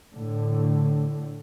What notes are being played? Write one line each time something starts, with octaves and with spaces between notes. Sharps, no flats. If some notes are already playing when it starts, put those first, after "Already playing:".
A2 D3